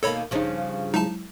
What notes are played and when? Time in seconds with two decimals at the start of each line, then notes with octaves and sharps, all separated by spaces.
0.03 B2 D#3 A#3 A4 C#5 B5
0.31 A#1 G2 C#3 F3 D#4
0.94 F#3 G#3 D#4 E4 A5